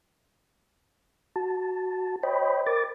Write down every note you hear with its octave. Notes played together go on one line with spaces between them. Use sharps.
F#4 A5
C5 C#5 D#5 G5 B5
A#4 D6 A6